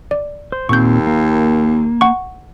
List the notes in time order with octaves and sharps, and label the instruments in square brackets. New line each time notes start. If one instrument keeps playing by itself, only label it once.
[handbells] D5
[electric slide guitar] C5
[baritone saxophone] D#2 [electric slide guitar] A#2 C4 [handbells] C#6 G6
[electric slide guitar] A#3
[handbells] F#5 C#6